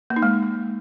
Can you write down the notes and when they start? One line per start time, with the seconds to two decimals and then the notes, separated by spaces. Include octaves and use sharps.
0.10 A#3
0.16 D#4
0.23 G#3